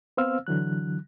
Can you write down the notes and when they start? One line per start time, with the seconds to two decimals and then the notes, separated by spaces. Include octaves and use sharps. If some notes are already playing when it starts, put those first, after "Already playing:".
0.17 B3 C4 C5 F5 E6 F6
0.47 D3 E3 F#3 F#6